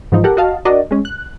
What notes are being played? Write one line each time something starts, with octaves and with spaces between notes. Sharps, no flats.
G#2 E3 F3 D#4
G4 A4 A#4 F#5
F#4 D#5 F5 A5
D4 F#4 A#4 D5 D#5
G#3 C#4
F#6